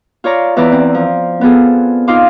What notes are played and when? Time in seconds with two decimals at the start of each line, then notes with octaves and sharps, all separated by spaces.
0.24 F4 C#5 D5 A#5
0.56 E2 E3 B4 D5 A#5
0.72 C4
0.94 F3
1.41 B3 C4 F4 G#4 A4
2.08 D#4 F4 D#5 F5 C6 D6